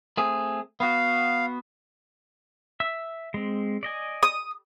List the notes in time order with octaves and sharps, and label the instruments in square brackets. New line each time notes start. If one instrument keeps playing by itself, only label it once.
[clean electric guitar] A3 C4 G#4
[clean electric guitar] B3 F#4 [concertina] F5
[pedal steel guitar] E5 E6
G#3 C4
D5 D#5 G#5
[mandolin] D#6